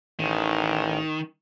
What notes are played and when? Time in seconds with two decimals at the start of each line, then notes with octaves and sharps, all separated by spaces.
0.20 A1 D#3